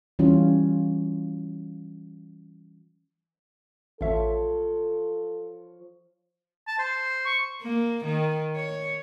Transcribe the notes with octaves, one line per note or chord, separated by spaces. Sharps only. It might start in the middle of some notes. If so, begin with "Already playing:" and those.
E3 G3 C#4 F4
A1 F3 A4 C#5 E5
A5
C5
C#6
A#3
D#3
C#5